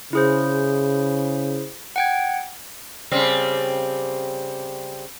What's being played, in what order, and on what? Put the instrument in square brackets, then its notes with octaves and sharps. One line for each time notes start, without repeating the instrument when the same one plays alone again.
[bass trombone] C#3 [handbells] E4 G#4 C5
[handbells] F#5 G5 G#6
[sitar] C#3 G3 C4